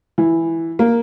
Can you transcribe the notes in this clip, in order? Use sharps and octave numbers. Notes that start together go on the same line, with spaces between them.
E3
A#3